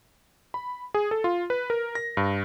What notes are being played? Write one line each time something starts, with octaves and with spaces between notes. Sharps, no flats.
B5
G#4
A4
F4
B4
A#4
A#6
G2